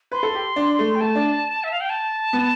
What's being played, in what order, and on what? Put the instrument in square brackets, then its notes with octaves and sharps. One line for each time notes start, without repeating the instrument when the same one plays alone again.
[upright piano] B4 [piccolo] C6
[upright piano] A4
G4
D4
A3
[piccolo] G5
[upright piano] A3 [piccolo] A5
[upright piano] D4
[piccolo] E5
F5
G5
A5
[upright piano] B3